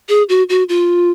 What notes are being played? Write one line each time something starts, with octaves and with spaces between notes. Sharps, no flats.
G#4
F#4
F#4
F4